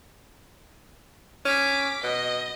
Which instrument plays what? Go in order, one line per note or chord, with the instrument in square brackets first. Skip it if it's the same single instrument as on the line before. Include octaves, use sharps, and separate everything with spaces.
[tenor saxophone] C#4 [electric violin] D6 B6
[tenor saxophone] B2 [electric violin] D#5